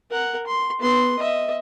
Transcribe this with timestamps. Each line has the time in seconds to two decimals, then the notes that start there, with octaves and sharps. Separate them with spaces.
0.11 A#4 F#5
0.47 C6
0.79 B3 C6
1.19 D#5 E5